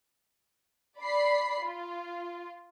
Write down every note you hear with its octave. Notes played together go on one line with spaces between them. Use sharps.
D5 B5 C7
F4